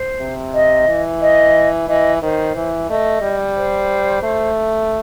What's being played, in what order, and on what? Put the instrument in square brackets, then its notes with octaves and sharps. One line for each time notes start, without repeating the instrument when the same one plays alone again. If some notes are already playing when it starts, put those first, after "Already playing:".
Already playing: [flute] C5
[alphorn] C3
[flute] D#5
[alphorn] E3
[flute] D#5
[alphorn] E3 [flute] D#5
[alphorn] D#3 [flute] C5
[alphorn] E3
[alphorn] A3 [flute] D#5
[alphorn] G3
[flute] C5
[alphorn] A3